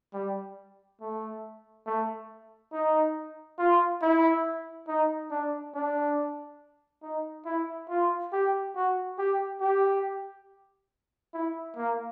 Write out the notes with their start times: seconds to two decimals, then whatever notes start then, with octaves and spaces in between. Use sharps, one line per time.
0.14 G3
1.01 A3
1.87 A3
2.73 D#4
3.59 F4
4.02 E4
4.88 D#4
5.31 D4
5.75 D4
7.03 D#4
7.46 E4
7.89 F4
8.33 G4
8.76 F#4
9.19 G4
9.61 G4
11.34 E4
11.77 A#3